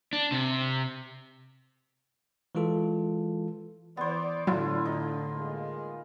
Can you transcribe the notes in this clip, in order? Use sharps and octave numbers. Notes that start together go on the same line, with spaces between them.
D4
C3
E3 G#3 F4 A4
E3 B3 C5 D5
A2 D3 F#3 D4 E4 F4
D#4
G#3 A#3